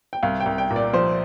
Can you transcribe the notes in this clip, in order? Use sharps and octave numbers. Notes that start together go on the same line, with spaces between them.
G5
C2 F5
G5
C2
G5
A#2
D5
F3 C5